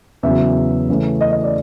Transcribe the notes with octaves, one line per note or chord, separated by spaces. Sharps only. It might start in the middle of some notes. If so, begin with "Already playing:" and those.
E2 C#3 F#3 E5
C#3 E3 A3 C#4
D#5
D#5
D5